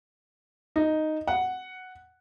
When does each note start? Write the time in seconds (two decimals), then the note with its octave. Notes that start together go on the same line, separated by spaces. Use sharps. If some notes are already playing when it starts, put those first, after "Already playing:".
0.76 D#4
1.27 F#5